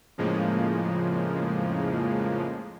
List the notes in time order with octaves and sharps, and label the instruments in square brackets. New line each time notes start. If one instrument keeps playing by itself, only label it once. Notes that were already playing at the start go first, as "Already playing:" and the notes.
[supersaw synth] F2 A2 C#3 F3 G#3 A#3